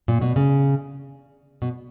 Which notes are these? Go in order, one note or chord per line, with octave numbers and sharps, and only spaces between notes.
A#2
B2
C#3
B2